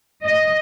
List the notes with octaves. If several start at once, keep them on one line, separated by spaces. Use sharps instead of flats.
D#5